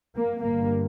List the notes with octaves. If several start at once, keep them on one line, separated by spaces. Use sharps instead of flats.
A#3
G1 G2 A#3